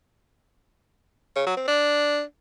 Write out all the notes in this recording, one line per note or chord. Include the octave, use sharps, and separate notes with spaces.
C#3
F#3
C4
D4